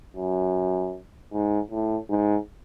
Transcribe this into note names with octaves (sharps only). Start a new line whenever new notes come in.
F#2
G#2
A2
G#2